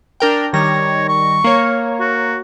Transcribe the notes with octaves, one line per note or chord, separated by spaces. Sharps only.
D4 A#4 G5
D#3 G3 C#5 A#6
C#6
A#3 C#5
F#4